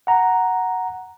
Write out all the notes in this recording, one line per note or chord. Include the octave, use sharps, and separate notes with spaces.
F#5 A#5